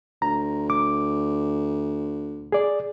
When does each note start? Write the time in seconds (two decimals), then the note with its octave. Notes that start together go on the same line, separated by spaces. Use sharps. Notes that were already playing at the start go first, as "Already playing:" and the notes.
0.22 D2 A#5
0.70 D6
2.52 G#4 D5